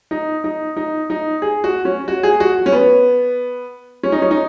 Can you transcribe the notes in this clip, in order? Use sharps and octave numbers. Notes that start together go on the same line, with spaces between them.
D#4
D#4
D#4
D#4
G#4
F#4
C#4
F#4
G#4
F#4
C#4
B3
C#4
D#4
C#4
D#4